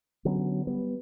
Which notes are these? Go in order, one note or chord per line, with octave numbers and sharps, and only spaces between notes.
D3 F#3 B3 C#4
G3 B3